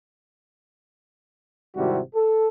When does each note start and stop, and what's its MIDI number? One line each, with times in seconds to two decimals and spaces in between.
1.75 2.00 32
1.75 2.00 48
1.75 2.00 55
1.75 2.00 64
1.75 2.00 66
2.15 2.47 69